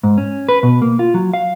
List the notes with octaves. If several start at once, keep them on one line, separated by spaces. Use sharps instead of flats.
G#2
C#4
B4
B2
A#3
F4
F#3
F5